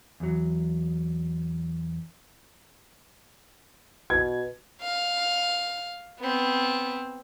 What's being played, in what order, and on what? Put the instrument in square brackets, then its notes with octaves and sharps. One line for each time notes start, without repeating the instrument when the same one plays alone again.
[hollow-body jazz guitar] E2 F#3
[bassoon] B2 [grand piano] G#6
[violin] F5
B3 C4